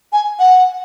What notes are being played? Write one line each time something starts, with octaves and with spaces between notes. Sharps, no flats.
G#5
F#5